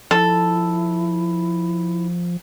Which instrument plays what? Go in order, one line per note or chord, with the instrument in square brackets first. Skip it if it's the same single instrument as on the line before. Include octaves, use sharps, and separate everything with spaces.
[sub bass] F3 [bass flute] E4 [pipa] A4